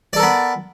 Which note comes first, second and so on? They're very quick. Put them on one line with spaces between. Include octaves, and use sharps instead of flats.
D5 A4 A#4 B3